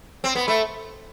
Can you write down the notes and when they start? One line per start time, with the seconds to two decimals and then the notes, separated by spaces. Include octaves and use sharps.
0.24 C4
0.35 B3
0.48 A3